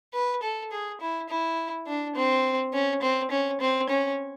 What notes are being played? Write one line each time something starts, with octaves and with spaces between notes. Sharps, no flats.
B4
A4
G#4
E4
E4
D4
C4
C#4
C4
C#4
C4
C#4